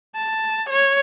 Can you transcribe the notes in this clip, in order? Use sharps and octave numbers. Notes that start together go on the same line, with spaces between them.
A5
C#5